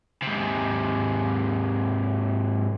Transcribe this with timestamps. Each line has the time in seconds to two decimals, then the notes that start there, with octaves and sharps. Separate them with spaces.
0.23 G#2 C3